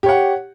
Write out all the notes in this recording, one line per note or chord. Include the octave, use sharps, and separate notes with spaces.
G4 C#5 F#5